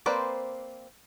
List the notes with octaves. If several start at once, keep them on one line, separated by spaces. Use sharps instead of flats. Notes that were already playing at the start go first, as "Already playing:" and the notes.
A#3 C4 B4 C5 D5